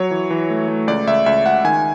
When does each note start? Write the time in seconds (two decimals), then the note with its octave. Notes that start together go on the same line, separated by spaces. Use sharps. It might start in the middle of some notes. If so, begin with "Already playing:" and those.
Already playing: F#3 C#5
0.11 E3
0.30 E3
0.50 A3
0.68 A3
0.87 C#2 D5
1.07 C#2 E5
1.26 C#2 E5
1.45 C#2 F#5
1.64 D#3 G#5